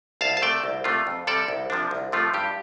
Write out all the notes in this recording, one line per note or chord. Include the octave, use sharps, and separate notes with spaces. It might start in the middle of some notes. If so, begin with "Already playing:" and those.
C2 F5 A5
A5
C3 A3 D5 G5
C2
C3 A3 F4
F2
C3 G3 A4 D5
C2
C3 F3 D4
C2
C3 F3 A3 F4
G2 G4